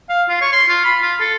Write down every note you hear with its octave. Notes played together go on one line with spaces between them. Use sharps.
F5
F4
C#5
C6
F4
B5
F4
A4